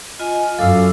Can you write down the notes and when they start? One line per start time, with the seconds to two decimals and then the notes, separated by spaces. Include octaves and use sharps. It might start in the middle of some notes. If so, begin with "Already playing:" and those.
0.19 F4 D#5 G#5
0.59 F#2 A4 F5 D6 E6